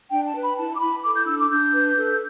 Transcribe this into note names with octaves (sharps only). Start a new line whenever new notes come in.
D4 G5
A5
B4
B5
E4 A5
D6
E4 B5
A4 D6
G6
D4 E6
D6
D4 G6
B4
A4